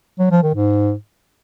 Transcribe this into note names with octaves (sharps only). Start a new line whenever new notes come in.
F#3
F3
D#3
G#2